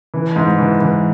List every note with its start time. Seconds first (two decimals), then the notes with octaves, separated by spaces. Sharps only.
0.14 E3
0.36 G#2
0.58 E3
0.80 E3